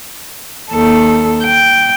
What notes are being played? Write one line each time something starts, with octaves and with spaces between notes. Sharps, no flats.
D#2 A4
G5